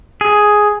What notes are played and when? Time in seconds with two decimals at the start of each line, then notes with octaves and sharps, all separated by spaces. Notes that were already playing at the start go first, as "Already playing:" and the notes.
0.21 G#4